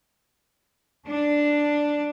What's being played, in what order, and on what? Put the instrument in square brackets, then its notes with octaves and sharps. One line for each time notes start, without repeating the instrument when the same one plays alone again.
[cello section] D4